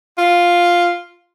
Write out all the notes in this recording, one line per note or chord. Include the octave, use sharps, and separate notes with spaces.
F4